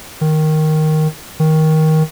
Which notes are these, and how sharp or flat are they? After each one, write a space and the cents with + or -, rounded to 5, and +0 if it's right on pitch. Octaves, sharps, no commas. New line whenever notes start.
D#3 +0
D#3 +15